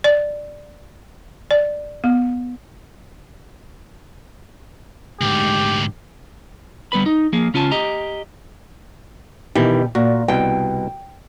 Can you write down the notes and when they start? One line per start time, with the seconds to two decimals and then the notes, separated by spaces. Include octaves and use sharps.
0.04 D5
1.51 D5
2.04 B3
5.21 D2 G#2 G4
6.92 D2 G3 B3 B4 B5
7.06 D#4
7.33 F3 A#3 G#4
7.54 C#3 C#4 F4 G#5 A5
7.71 G4 D#5 A#5
9.55 B2 D#3 E3 G4
9.95 A#2 F#4
10.28 C2 B2 G5